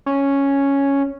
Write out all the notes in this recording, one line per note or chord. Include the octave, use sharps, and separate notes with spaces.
C#4